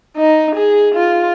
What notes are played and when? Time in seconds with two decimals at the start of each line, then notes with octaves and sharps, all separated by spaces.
0.17 D#4
0.55 G#4
0.95 F4